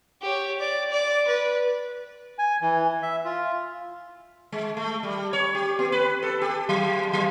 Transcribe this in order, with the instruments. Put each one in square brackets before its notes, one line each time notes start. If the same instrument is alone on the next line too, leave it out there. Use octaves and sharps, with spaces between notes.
[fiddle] G4 C#5
D5
D5
B4
[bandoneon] G#5
E3
E5
F4
[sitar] G#3
A3
G3
C#5
G4
B3
B4
A4
G4
F#3
F#3